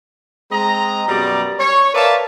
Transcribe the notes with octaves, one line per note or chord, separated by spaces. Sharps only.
G#3 C4 D#5 A#5
F#2 B2 G3 D5 A#5
C#5
A#4 B4 D5 E5 F5 A5